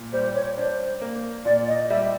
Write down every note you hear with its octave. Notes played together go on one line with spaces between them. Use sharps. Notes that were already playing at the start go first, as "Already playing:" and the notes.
Already playing: A#2
G3 C5
C#5
D4 C5
A#3
A#2 D5
D#5
G3 E5